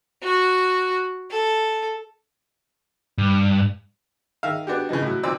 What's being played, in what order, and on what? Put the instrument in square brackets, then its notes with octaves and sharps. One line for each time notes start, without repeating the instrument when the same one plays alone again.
[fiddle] F#4
A4
[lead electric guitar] G2
[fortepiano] D#3 E5 F5
B3 D4 F#4 G4
C#3 E3 F3 D#4
A2 F#3
B1 F3 C4 D5 E6